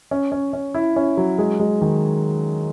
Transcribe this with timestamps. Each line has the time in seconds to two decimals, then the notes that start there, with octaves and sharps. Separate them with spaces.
0.11 C#4
0.32 C#4
0.53 C#4
0.74 E4
0.96 C#4
1.17 F#3
1.38 G#3
1.60 G#3
1.81 D#3